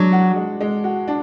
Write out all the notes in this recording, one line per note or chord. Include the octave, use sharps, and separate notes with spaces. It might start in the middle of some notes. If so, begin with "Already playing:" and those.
Already playing: F#3 G#3 D4
F#4
G#3
G#3
F#4
D4